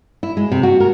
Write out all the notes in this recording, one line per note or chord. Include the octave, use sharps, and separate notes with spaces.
E4
G#3
C3
F#4
A#4